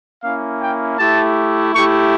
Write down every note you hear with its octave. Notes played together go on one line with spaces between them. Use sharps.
A#3 C#4 E4 F5
G5
A3 E4 G4 A5
A3 E4 G4 C#6